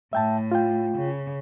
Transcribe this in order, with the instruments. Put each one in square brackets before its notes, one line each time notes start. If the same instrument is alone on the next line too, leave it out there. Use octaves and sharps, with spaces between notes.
[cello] A2 [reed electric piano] E5 G5 A5
[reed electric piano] F4 G5
[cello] C#3